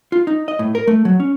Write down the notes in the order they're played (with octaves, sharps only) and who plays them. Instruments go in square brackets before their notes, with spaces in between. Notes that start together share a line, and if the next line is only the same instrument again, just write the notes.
[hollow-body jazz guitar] F4
D#4
D#5
A2
A#4
A3
F#3
C#4